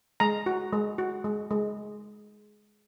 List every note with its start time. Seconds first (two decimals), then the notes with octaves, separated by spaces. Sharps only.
0.20 G#3 A#5
0.46 F#4
0.73 G#3
0.98 F#4
1.24 G#3
1.51 G#3